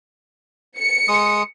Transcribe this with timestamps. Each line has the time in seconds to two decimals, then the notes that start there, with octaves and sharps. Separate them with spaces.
0.78 C#7
1.08 G#3 D#6